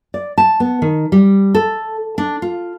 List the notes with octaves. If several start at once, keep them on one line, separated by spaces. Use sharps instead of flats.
D5
A5
B3
D#3
G3
A4
D4
F4